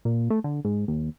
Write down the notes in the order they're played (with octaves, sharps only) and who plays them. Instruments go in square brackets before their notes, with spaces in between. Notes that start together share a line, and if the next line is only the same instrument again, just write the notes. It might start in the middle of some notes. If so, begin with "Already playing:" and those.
[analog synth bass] A#2
A3
D3
G#2
D#2